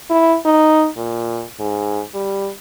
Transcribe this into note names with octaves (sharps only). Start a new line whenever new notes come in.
E4
D#4
A#2
G#2
G3